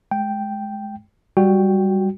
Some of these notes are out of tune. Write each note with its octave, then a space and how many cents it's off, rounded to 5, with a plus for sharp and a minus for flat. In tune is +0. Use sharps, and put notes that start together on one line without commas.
G#3 +25 G5 +0
G3 +0 F#4 +0 G5 +0